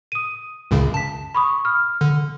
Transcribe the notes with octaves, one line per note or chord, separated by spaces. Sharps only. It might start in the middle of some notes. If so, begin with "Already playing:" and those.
D#6 D#7
C#2 F#2 C#3
A5 B6
B5 C#6 D#6
F6
D3